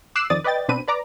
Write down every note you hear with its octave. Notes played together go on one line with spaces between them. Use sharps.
D6 E6 F#6 C7 E7
F2 D#3 C4 D5 D#6 A6
B4 D5 D#5 G5 A6
B2 C4 D4 B4 D#7
B4 D5 A#5 D6